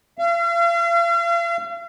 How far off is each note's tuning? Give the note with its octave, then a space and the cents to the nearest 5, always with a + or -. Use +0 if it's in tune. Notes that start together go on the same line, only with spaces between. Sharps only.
F5 -40